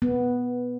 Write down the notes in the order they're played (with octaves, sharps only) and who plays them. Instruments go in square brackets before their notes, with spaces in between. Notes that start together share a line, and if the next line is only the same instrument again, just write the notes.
[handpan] B3